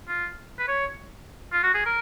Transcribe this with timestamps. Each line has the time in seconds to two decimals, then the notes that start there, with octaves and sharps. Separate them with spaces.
0.08 F4
0.59 B4
0.68 C#5
1.52 F4
1.63 F#4
1.74 G#4
1.85 A#4